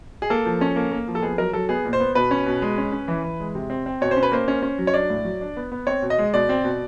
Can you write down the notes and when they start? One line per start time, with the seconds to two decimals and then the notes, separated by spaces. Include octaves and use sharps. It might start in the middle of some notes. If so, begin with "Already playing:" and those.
0.22 G#4
0.30 A#3 A4
0.46 F3
0.61 C#4
0.76 A#3
0.91 A#3
1.08 F3
1.15 A4
1.23 B3 G#4
1.38 F#3 A#4
1.53 F#3 A4
1.69 B3 G#4
1.85 A#2
1.93 C5
2.00 B3
2.15 B2 B4
2.31 C#4
2.46 B2
2.62 G#3
2.78 C#4
2.92 C#4
3.08 E3
3.24 E3
3.40 G#3
3.55 C3
3.70 C4
3.86 C4
4.01 B2 C#5
4.11 C5
4.16 C#4
4.23 B4
4.32 A#3 C5
4.48 C#4
4.63 C#4
4.78 F#3
4.87 C#5
4.94 D4 D5
5.10 A2
5.25 F#3
5.41 D4
5.57 B3
5.72 B3
5.87 C4 C#5
6.02 B2
6.10 D#5
6.18 G#3
6.34 B2 D5
6.49 C4
6.64 B2